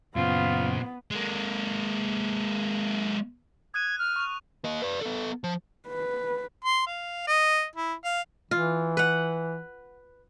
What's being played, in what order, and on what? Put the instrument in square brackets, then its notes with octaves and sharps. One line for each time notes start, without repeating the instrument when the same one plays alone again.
[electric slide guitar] F#2 C#3 [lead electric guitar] A#2 C5 [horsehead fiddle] B3 [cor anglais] F4
[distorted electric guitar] G#3 A#3
[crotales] D#6 F#6 D#7 [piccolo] G#6
[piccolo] F6
[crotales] C#6 F7
[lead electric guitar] A#3 D#5
B4 D5
B3 A4
F3
[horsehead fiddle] B4
[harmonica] C6
F5
D#5
E4
F5
[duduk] E3 [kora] F4
[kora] B4 F#5